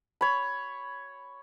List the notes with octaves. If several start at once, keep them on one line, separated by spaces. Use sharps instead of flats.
C#5 B5